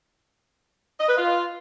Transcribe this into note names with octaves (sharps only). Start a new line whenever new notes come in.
D#5
B4
F4